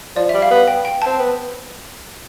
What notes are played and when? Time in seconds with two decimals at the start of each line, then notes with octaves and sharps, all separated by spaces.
0.16 F3 D5
0.29 E5
0.34 G3
0.42 F5
0.51 B3
0.68 G5
0.85 G5
1.02 C4 A5
1.19 B3